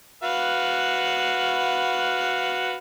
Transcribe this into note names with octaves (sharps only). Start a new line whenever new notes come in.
F#4 B4 F5